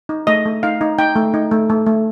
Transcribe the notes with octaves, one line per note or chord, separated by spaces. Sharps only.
D#4
A3 D#5
A3
D#4 F5
D#4
D#4 G5
A3
D#4
A3
A3
A3